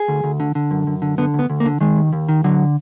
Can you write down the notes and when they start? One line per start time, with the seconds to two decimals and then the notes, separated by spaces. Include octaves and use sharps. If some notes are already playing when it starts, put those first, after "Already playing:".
Already playing: G#4
0.08 D2
0.24 D2
0.40 D3
0.55 D3
0.71 F#2
0.87 F#2
1.02 D3
1.18 D3 B3
1.34 D2 B3
1.50 D2
1.60 A#3
1.66 D3
1.81 D#3 G#3
1.97 D#2
2.13 D#2
2.29 D#3
2.44 D3 F#3